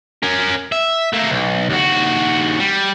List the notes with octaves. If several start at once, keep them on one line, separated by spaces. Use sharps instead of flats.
C#4 A#4
E5
A3 A#3
B1
D#2 F#4
G3